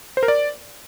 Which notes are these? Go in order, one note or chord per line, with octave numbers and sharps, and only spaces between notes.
C5
A#4
D5